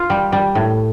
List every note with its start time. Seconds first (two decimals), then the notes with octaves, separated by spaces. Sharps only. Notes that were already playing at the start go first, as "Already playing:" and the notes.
Already playing: F4
0.10 G3
0.32 G3
0.55 A2